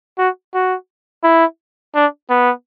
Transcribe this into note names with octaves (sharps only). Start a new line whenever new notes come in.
F#4
F#4
E4
D4
B3